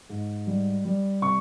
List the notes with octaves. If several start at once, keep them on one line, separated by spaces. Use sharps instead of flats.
G#2
G3
G3
C3 C#6